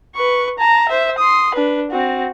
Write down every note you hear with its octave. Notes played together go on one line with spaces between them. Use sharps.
B4 C#6
A5 A#5
C5 E5
C6 D#6
D4 B4
C4 F#4